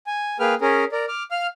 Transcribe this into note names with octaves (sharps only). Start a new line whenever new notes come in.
G#5
A#3 G#4 B4 G5 F6
C#4 G#4 A#4
A#4 D5
D6 F6
F5 F6